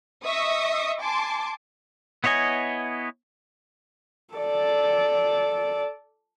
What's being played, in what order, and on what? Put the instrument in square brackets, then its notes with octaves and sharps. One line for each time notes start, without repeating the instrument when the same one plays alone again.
[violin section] D#5 E5 C#6 D#6
G#5 A5 C6 D6
[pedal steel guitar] B3 E4 C#5 D#5 G#5
[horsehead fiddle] A4 D5